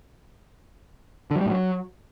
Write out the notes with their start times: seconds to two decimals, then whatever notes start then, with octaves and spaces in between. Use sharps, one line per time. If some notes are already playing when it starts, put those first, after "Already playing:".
1.31 D3
1.36 F#3
1.41 G3
1.46 A2
1.51 F#3